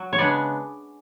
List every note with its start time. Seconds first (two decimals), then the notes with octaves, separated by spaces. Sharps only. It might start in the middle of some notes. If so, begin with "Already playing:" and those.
Already playing: F#3
0.13 C#5
0.18 C#3 G#3 B3 D4 D5